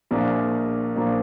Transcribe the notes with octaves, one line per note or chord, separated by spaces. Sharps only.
A#1 A#2 F3 A#3 D4
A#2 F3 A#3 D4